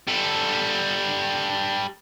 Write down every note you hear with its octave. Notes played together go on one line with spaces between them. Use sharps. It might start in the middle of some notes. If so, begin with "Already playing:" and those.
G3 A4